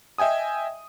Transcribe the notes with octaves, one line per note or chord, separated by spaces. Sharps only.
D#5 E5 G5 G#5 D#6